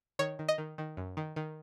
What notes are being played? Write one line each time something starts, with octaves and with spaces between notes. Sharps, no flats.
D#3 C#5
D#3
D#5
D#3
D#3
F#2
D#3
D#3